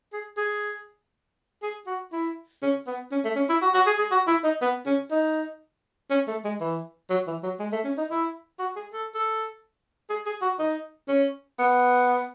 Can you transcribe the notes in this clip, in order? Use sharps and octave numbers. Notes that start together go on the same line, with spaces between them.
G#4
G#4
G#4
F#4
E4
C#4
B3
C#4
A3
C#4
E4
F#4
F#4
G#4
G#4
F#4
E4
D#4
B3
C#4
D#4
C#4
A3
G#3
E3
F#3
E3
F#3
G#3
A3
C#4
D#4
E4
F#4
G#4
A4
A4
G#4
G#4
F#4
D#4
C#4
B3